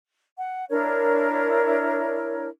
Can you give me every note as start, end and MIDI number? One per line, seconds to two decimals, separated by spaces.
0.36 0.65 78
0.70 2.47 62
0.70 2.47 64
0.70 2.47 70
0.70 2.47 73